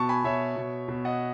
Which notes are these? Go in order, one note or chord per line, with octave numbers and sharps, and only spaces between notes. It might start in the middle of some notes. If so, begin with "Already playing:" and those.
Already playing: B2 A5 C#6
G#5 B5
B2 C#5 E5
B2
B2
D#5 F#5